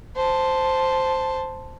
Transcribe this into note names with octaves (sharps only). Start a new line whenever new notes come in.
C5 A5